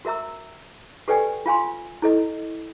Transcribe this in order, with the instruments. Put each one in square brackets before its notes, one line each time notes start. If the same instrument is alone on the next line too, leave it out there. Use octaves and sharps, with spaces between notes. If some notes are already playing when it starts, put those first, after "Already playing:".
[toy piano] F#4 A#4 E5 A#5 E6
G4 A4 B4 D5 G5 G#5
F4 F5 G#5 C6
E4 A4 D#5